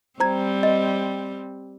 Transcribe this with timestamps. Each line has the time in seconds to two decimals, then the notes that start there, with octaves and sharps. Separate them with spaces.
0.20 G3 C4 C5 A#5 G#6
0.63 C5 D#5